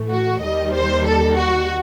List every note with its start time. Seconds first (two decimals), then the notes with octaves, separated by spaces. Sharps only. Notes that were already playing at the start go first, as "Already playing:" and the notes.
Already playing: A2 E3 A3
0.09 F#4
0.41 D#2 D#3 G3 D#5
0.73 C5
1.04 A4
1.36 F#4